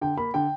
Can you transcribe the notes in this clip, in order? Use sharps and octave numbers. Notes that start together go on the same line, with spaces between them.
D3 G5
A#3 B5
D3 G5